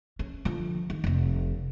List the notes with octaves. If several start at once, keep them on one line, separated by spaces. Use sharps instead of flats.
C#4
D3 F3
D#3
F1 C4